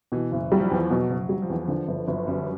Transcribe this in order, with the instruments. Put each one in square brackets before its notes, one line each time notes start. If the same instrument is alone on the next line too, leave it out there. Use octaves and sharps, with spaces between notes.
[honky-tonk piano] B2 [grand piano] E3
[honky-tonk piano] F#1
[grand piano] F#3 [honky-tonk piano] G3
[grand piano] F3
E3
[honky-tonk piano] E2 [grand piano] F3
[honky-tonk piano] B2 [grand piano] F#3
[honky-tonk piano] F#1 [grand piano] F#3
[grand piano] F#3 [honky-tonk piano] G3
[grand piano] F3
[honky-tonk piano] E2
[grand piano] E3
[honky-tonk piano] D3 [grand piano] F3
[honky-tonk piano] G1
[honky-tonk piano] G1 [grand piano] F#3
[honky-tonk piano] F#2 [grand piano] G3